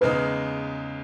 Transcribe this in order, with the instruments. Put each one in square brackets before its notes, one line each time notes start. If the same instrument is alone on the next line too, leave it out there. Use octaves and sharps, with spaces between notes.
[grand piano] E2 C#3 G#3 D#4 [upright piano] B4